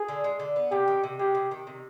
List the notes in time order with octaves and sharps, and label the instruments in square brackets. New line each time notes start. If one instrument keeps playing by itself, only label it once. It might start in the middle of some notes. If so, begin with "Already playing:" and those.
Already playing: [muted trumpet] G#4
[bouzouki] D3
G#3
D3
B3
[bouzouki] C3 [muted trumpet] G4
[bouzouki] D#3
C3
[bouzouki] G#3 [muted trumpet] G4
[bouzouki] C3
D#3
C3